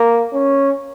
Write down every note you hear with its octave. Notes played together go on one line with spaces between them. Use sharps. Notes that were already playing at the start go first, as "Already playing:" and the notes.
Already playing: A#3
C#4